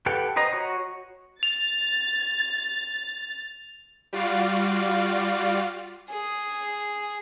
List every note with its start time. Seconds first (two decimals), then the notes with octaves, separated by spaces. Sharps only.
0.06 G4 A4 B4 F#5 G5
0.36 B4 C5 D#5 A#5
0.53 F#4 C#5
1.43 A6 F7
4.13 G3 F4 F#4 D5 F5
6.10 G#4